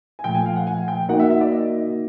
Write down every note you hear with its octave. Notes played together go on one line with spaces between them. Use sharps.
G#5
A#2 F3 A3 G5
G#5
F5
F#5
G#5
G5
A#3 D#4 F#4 A#4 F#5
E5
E5
D5
D#5